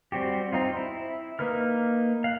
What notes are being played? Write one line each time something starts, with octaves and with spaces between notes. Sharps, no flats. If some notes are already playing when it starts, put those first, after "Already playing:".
G3 C4 F#4 G4
C4 D#4 F4
E4
A#3 D#4 B4 F6
F5 F#5